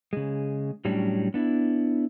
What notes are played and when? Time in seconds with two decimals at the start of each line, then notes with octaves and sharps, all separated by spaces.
0.13 C#3 G#3
0.85 A2 F#3 G3 C#4 D4
1.34 B3 D4 E4